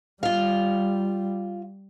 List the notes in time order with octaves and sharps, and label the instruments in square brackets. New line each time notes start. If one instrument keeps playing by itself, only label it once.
[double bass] G3 [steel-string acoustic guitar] F4 F5